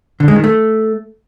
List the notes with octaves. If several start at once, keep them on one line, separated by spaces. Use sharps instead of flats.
D3
G#3
D#3
A3